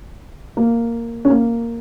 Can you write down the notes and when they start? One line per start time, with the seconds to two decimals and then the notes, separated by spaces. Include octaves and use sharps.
0.57 A#3
1.25 C#4
1.30 A#3